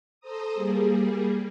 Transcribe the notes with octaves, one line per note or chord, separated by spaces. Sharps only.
A4 C5 A#5 D#6
G3 A#3 G#4